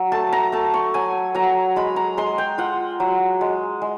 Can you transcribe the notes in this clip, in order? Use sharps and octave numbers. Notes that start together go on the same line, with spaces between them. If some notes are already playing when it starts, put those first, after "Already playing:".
Already playing: F#3
A3 A5
A#5
A3 A5
C#6
F#3 G#5
F#3 A#5
G#3 B5
A#5
G#3 C6
G5
F4 F#5
F#3
G#3
G#3